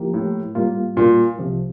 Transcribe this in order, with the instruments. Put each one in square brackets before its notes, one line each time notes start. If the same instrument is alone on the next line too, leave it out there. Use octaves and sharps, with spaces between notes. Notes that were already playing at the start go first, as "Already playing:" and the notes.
Already playing: [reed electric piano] F3 A#3 E4 G4 A#4
[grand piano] A2
[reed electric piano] A2 G3 A#3 F4
[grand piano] A#2
[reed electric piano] C2 C3 F3